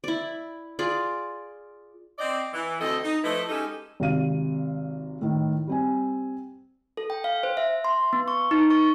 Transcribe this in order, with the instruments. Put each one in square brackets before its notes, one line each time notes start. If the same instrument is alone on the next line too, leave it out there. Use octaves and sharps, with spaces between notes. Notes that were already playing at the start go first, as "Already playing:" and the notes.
[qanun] E4 D5
F4 G#4 D5
[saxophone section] C4 D5 D#5
E3
D2 C4 A4 D#5
D#4
F3 A3 E4 A4 B4 D#5
G#3 C#4 D#4 G4 A4
[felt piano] G#1 C3 F5 D#7
A2 D#3
G3 C4 G#5
[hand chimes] A4
G5
F5
C5
E5
C6
B3
C#6
D#4
C#6